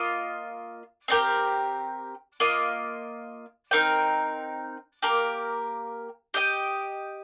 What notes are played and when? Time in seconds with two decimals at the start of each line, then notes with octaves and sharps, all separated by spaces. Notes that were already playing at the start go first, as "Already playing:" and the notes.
Already playing: A#3 F4 D#5
1.08 C4 D#4 G4 A#4
2.40 A#3 F4 D#5
3.71 C4 D#4 A#4 G5
5.02 A#3 G4 A#4
6.34 G4 D#5 G5